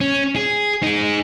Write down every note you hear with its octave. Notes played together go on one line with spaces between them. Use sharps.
C#4
G#4
D#4 G#4